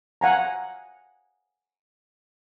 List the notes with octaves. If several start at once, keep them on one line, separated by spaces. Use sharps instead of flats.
F5 F#5 G#5 A#5